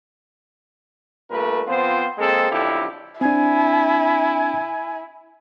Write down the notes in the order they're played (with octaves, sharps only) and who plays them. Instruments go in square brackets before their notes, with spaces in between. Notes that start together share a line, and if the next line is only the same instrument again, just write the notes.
[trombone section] G2 A#2 A3 A#4 B4
F3 B3 C4 F4 C5
G#3 A#3 C4 G#4 A4
B1 F2 D3 E4 G4
[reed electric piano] C4 D4 [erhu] E4 [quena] G#5